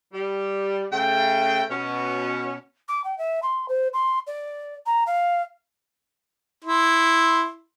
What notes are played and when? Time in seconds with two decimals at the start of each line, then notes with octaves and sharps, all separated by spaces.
0.12 G3
0.91 C#3 A3 G5
1.70 B2 C#4
2.88 D6
3.04 G5
3.18 E5
3.42 C6
3.68 C5
3.93 C6
4.27 D5
4.86 A#5
5.06 F5
6.65 E4 C6